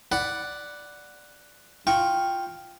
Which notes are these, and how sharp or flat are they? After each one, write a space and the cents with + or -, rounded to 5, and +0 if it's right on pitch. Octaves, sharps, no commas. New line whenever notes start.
D5 +0 F#5 +0 B5 +0
F4 +0 G5 +0 C#6 -10